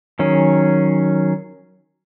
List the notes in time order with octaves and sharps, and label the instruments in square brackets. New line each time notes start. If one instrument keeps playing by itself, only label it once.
[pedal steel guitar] D#3 F#3 C#4 G#4